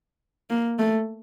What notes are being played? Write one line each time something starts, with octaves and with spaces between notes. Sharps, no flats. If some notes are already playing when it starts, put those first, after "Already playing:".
A#3
A3